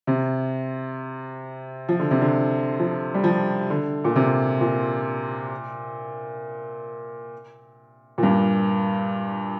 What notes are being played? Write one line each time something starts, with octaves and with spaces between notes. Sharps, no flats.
C3
F3
D3
C3
D3
F3
G3
F3
D3
A#2
C3
A#2
A#2
G2